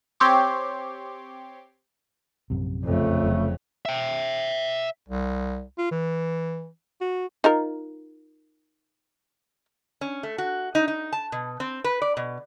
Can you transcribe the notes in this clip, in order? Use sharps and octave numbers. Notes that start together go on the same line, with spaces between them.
C4 G4 C#5 C6 D6
A#1 F#2 C3
F2 C#3 A3
F1 F#3
E5 G5
C2
F4
E3
F#4
D#4 F4 A#4
C#4
A3
F#4
D#4
D#4
A5
B2
C4
B4
D5
B2